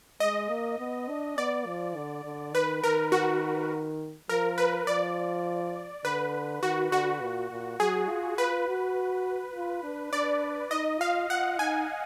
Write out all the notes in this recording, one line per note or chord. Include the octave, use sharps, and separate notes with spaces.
G#3 D#5
A#3
B3
D4
B3 D5
F3
D3
D3
D#3 B4
D#3 A#4
F#4
F3 A#4
B4
F3 D5
D3 B4
D#3 F#4
D3 F#4
A#2
A#2
F#3 G#4
F4
F4 B4
F#4
F4
D4
D4 D5
D#4 D#5
F4 F5
F4 F#5
D#4 G#5